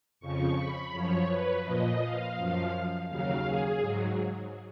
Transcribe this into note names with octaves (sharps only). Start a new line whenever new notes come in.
F2 C#3 F3 C#6
B5
F#2 F3 C#5
B4
A#2 F3 D#5
F5
F#2 F3
D#2 C#3 F#3 F5
G#4
G#2 F#3